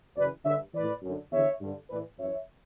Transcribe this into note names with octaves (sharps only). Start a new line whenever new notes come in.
F#2 C#3 E3 B4 D5
G2 D3 C#5 E5
A2 E3 B4 D5
F#2 D3
E2 D3 C#5 E5
G2 D3
A2 E3 B4 D5
F#2 E3 C#5 E5